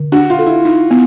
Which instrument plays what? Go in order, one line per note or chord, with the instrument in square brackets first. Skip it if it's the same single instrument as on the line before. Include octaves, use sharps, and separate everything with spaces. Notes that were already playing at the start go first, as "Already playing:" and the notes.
Already playing: [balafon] D3
[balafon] D4 [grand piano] F#4
[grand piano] F4
[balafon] A4
[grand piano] E4
[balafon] D#4
B3